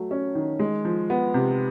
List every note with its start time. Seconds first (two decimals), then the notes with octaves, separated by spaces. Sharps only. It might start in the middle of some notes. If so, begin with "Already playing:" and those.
Already playing: F#3 A3
0.11 C#4
0.35 D#3
0.59 G#3
0.85 F3
1.10 B3
1.34 C3